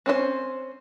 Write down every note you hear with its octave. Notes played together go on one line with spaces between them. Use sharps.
C4 C#4 D#4 C5